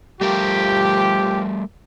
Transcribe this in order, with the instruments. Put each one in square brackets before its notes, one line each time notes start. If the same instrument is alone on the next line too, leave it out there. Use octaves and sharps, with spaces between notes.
[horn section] F3 G4 [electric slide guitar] G3 A3 A#4